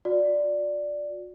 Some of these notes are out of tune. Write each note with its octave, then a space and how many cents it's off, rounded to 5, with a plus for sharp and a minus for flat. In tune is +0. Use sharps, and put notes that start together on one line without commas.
F#4 -45 D5 +0